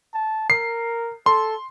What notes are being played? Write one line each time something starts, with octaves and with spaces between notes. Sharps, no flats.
A5
A#4 C7
A4 C6